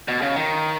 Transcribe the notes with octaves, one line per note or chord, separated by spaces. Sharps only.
B2
C#3
D#3